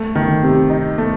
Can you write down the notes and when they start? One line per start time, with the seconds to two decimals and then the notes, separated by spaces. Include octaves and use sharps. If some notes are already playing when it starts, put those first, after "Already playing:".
Already playing: A3
0.15 D#3
0.43 C3
0.70 D#4
0.98 A3